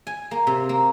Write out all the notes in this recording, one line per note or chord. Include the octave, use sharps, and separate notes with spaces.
G#5
A#3
C3
A#3